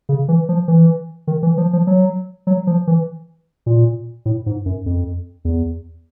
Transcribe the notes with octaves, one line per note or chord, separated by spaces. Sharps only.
C#3
E3
F3
E3
D#3
E3
F3
F3
F#3
F#3
F3
E3
A#2
A2
G#2
F#2
F2
E2